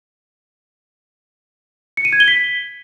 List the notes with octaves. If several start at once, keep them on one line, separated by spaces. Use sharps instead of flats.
C#7
D#7
G#6
G7
B6